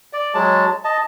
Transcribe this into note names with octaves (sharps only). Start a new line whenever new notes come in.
D5
F#3 G#3 A5
D#5 A5